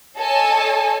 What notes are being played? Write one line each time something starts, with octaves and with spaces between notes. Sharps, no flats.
A4 C#5 D#5 G#5 A5